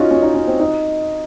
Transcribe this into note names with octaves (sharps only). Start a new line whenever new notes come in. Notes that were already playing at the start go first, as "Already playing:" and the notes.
Already playing: C#4 D#4 F4 F#4
C#4
D#4
C#4
C4
D#4